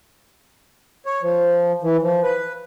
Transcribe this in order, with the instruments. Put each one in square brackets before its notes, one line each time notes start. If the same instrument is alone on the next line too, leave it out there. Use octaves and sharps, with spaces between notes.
[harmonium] C#5
F3
E3
F3
B4